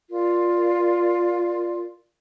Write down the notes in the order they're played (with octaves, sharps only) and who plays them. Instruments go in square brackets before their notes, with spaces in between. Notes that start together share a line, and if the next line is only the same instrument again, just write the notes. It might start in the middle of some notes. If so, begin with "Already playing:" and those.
[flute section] F4 A#4 D5